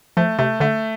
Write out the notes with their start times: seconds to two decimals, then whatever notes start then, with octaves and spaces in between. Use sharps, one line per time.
0.17 F3 A3
0.38 C3 A3
0.60 D3 A3